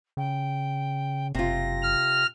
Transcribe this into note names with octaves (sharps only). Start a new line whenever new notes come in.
C#3 G5
F#1 C3 F4 A#6
F6